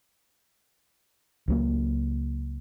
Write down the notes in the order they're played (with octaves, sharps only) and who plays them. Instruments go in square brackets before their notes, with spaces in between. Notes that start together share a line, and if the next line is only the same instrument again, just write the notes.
[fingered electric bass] C#2 F#3 A#3